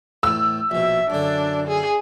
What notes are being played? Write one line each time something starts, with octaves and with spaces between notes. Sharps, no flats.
E2 A2 E6
A#1 B2 E5
F#2 D3 D4
G#4